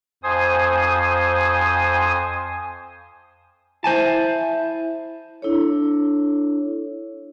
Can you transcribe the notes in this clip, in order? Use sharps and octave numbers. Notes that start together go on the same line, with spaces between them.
F2 C5 G#5 D#6
E4 C5 G#5 A5
D4 E4 A4 C#5